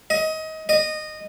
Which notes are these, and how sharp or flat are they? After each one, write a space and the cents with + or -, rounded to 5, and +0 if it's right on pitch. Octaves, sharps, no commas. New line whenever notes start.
D#5 +25
D#5 -15